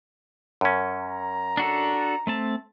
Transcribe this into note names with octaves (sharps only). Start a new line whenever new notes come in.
F#2 C#4
A#5
D4 F#4 A4
A3 C4 A5